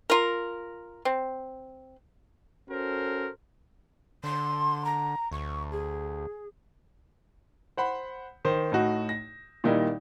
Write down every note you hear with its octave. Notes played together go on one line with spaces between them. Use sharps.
F4 A#4
C4
C#4 F#4 A4 A#4 C5
D3 C6
A#5
D2 C#6
G#4
C5 F#5 B5
D#3 C5
A2 D#4 F#4
A#6
A#2 D#3 G3 D#4 E4